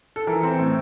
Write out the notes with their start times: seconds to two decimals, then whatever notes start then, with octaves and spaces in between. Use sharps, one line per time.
0.16 A4
0.27 E3 A#4
0.43 C4
0.59 A2